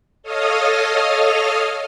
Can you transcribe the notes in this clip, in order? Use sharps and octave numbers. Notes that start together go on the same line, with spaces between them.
A4 C#5 D#5 F5 D#6 F6